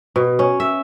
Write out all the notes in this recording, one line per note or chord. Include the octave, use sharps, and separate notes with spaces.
B2
C#4
E5